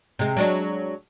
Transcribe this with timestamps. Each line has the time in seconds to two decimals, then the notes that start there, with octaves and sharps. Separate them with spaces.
0.19 C3 G#3
0.36 F#3 G#3 D4